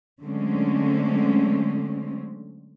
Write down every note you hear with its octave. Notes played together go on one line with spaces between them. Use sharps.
D3 F#3 G#3 A3 C4 C#4